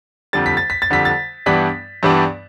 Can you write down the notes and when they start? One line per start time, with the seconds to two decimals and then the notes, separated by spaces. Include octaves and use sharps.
0.33 F2 D3 G3 A6
0.46 B6
0.57 A6
0.70 B6
0.82 A6
0.90 F2 D3 G3 B6
1.05 A6
1.46 G2 E3 G3 B3 D4 B6
2.03 G2 E3 G3 B3 D4